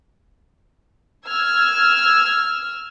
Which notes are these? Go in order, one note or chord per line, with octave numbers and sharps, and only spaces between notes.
E6 F6 G#6